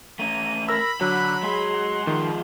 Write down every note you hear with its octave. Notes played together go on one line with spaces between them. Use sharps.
A3 C#4 A#5 D#7
A#4 B5 E6 A#6
D3 F#3 F#6
G#3 G#4 C6
D#4 F#5
D#3 F3 G#3